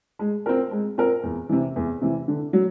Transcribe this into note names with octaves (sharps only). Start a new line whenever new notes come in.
G#3
C4 F4 A#4
G#3
C4 F4 A#4
E2
C3 E3
E2
C3 E3
D3
F#3